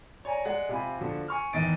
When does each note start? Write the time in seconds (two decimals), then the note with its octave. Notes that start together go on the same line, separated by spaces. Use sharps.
0.25 C#5 D5 G#5 A#5
0.45 G#3 D5 F#5
0.69 C3 F4 G#5 B5
0.99 D3 F3 F#4
1.28 G#5 C#6 F6
1.53 E2 G#2 D#3 D#5 A6 D7